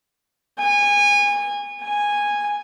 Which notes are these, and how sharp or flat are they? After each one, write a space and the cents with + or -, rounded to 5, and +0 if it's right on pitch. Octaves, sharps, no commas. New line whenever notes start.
G#5 -25
G#5 -10